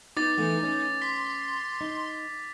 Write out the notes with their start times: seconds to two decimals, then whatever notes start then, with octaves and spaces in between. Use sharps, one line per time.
0.17 B3 D#4 D6 A6
0.38 E3 A3 B3
0.63 C#4
1.02 C6 B6
1.81 D#4